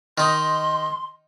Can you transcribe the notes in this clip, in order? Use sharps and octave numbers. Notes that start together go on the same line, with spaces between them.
D#3 D#4 C6